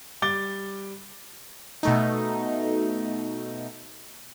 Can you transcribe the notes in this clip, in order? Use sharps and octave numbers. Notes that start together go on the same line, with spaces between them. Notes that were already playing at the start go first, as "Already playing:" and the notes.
G3 D6 A6 G7
B2 A3 D#4